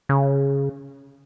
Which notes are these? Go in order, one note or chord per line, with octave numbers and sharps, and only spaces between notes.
C#3